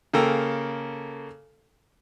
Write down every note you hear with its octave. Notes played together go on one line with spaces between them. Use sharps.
C#3 A#3 A4 G5 A#5 E6